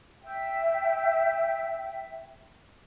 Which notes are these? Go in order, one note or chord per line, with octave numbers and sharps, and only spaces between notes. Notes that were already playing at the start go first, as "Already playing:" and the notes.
E5 G5